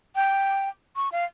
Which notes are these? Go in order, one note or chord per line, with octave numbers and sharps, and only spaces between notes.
G5
C#6
F5